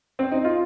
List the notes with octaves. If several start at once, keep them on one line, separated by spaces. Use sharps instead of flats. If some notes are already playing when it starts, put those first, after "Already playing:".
C4
D#4
F4